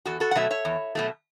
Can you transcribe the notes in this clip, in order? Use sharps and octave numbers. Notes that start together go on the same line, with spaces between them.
E2 F#4 A4
F#4 A4
F#5
B2 F#3 A3 E5
C#5 E5
E2
B2 F#3 A3